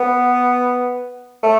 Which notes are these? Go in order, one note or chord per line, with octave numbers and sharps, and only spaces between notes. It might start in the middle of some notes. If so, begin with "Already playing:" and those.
Already playing: B3
A3